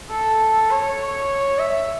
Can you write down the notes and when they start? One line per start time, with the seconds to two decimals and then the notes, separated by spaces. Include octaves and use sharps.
0.10 A4
0.70 C#5
1.59 E5